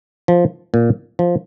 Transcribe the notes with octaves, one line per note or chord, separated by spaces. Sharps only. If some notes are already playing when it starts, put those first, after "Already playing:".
F3
A#2
F3